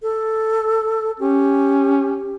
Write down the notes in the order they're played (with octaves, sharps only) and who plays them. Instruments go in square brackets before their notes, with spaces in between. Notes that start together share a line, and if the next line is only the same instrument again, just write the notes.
[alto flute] A4
[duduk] C#4 [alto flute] G4